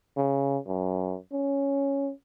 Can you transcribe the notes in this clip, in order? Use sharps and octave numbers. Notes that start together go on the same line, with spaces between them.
C#3
F#2
C#4